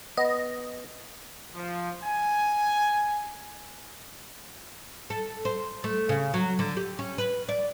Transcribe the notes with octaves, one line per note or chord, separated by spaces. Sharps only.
B3 D#5
F3
G#5
A4
C5
A3
C#3
F#3
D3
G4
C#4
B4
D5